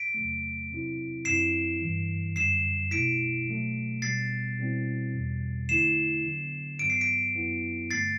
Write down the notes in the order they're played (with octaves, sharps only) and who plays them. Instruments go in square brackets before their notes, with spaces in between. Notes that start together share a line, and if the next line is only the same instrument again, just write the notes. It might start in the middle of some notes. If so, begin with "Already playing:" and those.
Already playing: [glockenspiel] B6 D7
[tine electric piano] E2 C3 F#3 A3
C3 F#3 C4 E4
[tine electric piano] F#2 F#3 C4 E4 [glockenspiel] C7 E7
[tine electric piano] G2 E3 G3
[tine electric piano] F#2 D3 G3 [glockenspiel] C7 E7
[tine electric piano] B2 A3 E4 [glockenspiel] B6 D7
[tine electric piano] B2 F#3 A3
[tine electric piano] B2 G3 B3 [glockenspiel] A6 C7
[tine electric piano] B2 G3 C4 E4
E2 B2 G3
[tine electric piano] D3 A3 E4 [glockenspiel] C7 E7
[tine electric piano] D3 F#3 B3
[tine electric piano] G2 F#3 B3 [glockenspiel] D7
[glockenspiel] C7
B6 D7
[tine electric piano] F#2 F#3 B3 E4
[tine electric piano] G2 D3 A3 [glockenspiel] A6 C7